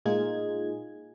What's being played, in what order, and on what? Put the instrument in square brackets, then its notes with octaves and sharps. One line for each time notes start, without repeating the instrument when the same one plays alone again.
[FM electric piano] A#2 G#3 D#4 F4 G#4 G#6